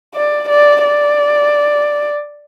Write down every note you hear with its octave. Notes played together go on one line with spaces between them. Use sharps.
D5
D5
D5